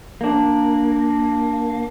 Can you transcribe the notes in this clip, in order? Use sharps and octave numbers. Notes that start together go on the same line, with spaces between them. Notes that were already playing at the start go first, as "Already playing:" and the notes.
A#3 D4